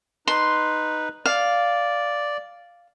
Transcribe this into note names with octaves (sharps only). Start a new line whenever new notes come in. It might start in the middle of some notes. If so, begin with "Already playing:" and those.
D#4 B4 C6
D5 F5